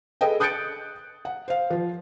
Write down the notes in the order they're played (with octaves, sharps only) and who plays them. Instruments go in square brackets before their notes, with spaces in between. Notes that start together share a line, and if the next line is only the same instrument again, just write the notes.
[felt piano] G#4 A4 B4 D#5 G5
D#6 F#6 G6 A6 C#7 D7
F#5
C5 F5
F3 F4